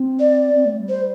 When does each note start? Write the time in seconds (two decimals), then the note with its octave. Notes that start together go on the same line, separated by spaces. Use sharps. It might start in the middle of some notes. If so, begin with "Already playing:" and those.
Already playing: C4
0.20 D5
0.53 C4
0.65 A3
0.77 G3
0.89 C5